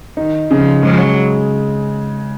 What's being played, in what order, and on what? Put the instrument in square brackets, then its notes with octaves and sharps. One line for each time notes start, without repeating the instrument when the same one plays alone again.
[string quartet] D#3 [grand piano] D#4
[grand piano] C#3 [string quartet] F3
[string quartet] F#3 [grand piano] G#3